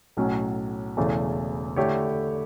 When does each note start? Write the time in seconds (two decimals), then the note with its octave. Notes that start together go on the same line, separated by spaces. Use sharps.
0.17 B1 A2 F#3 C#4
0.97 E1 E2 C#3 E3 A3
1.76 D3 A3 E4 G4 C#5